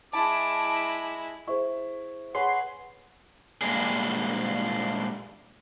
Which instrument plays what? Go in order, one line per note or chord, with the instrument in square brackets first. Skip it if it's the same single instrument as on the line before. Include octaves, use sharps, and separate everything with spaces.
[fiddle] G#3 E4 [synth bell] A5 [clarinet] D6
[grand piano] E4 [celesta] G#4 C5 C#6
[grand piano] G#4 B4 C#5 [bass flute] F#5 [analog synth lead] C6
[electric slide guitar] A#2 G3 G#3 A#3 D4 G#4